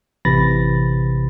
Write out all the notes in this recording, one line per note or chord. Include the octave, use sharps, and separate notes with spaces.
A1 C3 E3 B5 A6 A#6